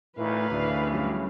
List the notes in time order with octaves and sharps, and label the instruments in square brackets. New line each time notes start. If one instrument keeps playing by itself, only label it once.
[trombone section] D2 D#3 E3 [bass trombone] A2 [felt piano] E4 [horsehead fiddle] B4 F5
[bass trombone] D2 [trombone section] A2 C#3 E3 [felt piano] D5 B5
[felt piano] F#3 G3 C#4